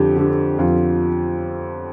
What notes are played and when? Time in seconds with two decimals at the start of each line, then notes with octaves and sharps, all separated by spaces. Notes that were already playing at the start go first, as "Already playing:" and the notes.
Already playing: F2 D3 G4
0.16 D3 G4
0.59 F2 F4